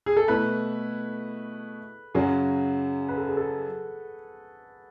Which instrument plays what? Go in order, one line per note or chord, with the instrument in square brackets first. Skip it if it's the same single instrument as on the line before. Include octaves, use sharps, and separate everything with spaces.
[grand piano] G#4
A4
[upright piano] B2 A3 E4 [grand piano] B4
[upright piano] F#2 C#3 F#3 C#4 [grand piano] F#4
[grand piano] B4
A4
G#4
A4